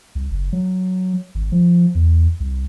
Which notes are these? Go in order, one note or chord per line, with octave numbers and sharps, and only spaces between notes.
C2
F#1
F#3
G#1
F3
E2
C2